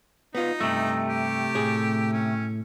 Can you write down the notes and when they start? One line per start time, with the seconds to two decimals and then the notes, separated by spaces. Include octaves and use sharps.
0.35 B3 D#4 F4
0.61 G2 C3 A3
1.09 G4
1.55 A2 G#4
2.13 C#4